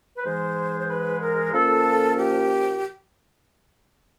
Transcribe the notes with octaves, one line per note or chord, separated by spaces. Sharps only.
B4
G#2 E3 G#3 C5
C5
B4
A#4
A#2 F3 A#3 C#4 A4
G4